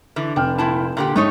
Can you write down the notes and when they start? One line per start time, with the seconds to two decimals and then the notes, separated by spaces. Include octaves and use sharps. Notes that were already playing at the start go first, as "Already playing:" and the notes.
0.16 D3 E3
0.36 F1 D4 G5 F6
0.58 A#2 E4 A5
0.97 A#2 D3 G4
1.16 G#2 A3 D#4 C#5